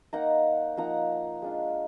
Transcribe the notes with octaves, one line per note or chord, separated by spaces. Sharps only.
A#3 D#4 F#5 A#5
F3 A#3 D#4 F#5 A#5
G#3 D4 F4